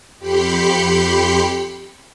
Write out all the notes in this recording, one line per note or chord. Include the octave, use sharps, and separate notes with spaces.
F2 G4 B5 C6 B6 C#7